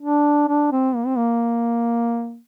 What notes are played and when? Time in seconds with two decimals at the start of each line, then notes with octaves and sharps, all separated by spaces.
0.01 D4
0.48 D4
0.72 C4
0.95 A#3
1.06 C4
1.17 A#3